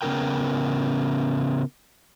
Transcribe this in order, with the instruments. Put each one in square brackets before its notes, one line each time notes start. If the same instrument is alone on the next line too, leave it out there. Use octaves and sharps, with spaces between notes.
[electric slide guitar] C#3 B3 C#4 G4 A#4 G5